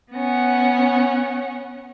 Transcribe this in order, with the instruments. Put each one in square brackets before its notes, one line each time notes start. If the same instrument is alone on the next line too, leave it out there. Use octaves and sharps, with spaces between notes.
[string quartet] B3 C#4 F#5